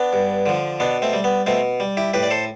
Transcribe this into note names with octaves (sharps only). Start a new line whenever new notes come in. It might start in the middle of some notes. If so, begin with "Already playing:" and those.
Already playing: B3 D4
G2
D3 F3
B2 B3 D4
A3 C4
G3
B3
B2 A3 C4
G3
E4 G4
A2 G4 B4
D5
A4 C5